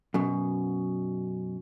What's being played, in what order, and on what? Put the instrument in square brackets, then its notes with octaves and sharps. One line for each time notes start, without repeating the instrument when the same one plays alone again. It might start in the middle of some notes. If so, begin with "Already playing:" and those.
[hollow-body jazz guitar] F#2 B2